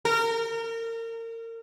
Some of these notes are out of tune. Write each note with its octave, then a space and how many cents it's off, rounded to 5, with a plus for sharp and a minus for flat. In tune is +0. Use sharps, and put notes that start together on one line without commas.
A#4 -30